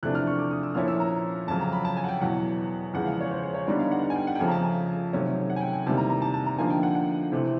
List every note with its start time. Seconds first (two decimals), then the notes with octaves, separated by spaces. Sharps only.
0.03 E2 C3 F3 A3 D4 F#6
0.15 F6
0.27 C#6
0.39 D6
0.51 D#6
0.63 E6
0.75 A#2 F3 A#3 C#4 E4 F6
0.88 E6
1.00 A#5
1.48 F2 C#3 F#3 A5
1.61 A#5
1.73 B5
1.85 A5
1.97 G#5
2.04 F#5
2.09 G5
2.21 E2 B2 F#3 F#5
2.94 E2 C#3 F3 G#3 F#5
3.06 F5
3.21 C#5
3.31 C5
3.43 C5
3.54 C#5
3.67 D3 G3 B3 D#4 D5
3.79 F5
3.91 F#5
4.03 F#5
4.10 G#5
4.16 G5
4.27 F#5
4.35 G5
4.39 F2 C#3 F3 A3 G#5
4.48 A#5
4.51 A5
4.64 G#5
5.13 C3 D#3 F#3 A3 C#4
5.50 F#5
5.56 G#5
5.61 G5
5.73 G#5
5.86 E2 C3 D#3 G3 A#3 A5
5.97 A#5
6.10 A#5
6.22 A5
6.34 A5
6.46 A#5
6.59 D3 F3 A#3 D#4 G#5
6.70 G5
6.83 F#5
6.95 F#5
7.32 C3 E3 A3 C4